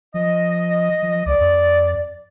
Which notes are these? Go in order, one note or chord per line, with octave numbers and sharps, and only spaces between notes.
F3 D#5
F3
C#2 D5
F2